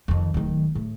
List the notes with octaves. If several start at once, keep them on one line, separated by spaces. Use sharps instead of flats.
F2 D#3
D1 D#3
A2